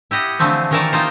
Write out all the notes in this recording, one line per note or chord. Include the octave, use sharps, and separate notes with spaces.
E4 G4 D#5 F#5
D3 E3 F3 A3 C4
D#3 E3 A#4 C#5 D5 A5
A#3 D#4 F4 C5